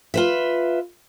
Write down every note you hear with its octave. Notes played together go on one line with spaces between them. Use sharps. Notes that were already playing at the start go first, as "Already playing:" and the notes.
F4 B4 E5